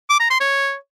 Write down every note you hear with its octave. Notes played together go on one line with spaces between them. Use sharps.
D6
A#5
C6
C#5